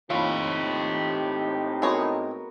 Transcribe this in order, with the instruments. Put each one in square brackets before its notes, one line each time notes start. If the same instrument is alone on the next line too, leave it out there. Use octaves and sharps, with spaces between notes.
[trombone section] A2 C4 D#4 [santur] F4 B5 [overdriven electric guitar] G4 C#5 [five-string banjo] F5
[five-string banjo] G#3 C#5 D#5 [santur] B3 F#4 A#4